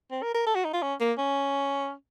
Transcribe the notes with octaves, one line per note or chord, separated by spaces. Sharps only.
C4
A#4
A#4
A4
F#4
D#4
F4
C#4
A#3
C#4